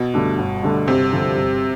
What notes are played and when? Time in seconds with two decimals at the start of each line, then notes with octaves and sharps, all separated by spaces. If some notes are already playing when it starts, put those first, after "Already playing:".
Already playing: B2
0.14 G2 D3 A3 D4
0.39 G1
0.63 G2 D3 A3 D4
0.88 G1 C3
1.13 G2 D3 F3
1.38 G1